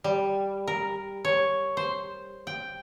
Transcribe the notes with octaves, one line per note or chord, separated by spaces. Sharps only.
G3
A#4
C#5
C5
G5